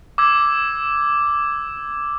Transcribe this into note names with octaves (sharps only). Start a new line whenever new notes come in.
D6 E6 G#6